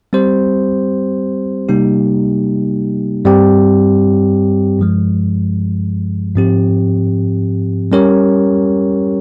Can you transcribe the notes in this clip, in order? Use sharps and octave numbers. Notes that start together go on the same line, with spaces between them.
G3 C4 G4 C5
C3 G3 A#3 D#4 G4
G2 G3 C4 G4
G2 F3 G#3
G#2 F3 C4 G4
G3 C#4 G4 A#4 C#5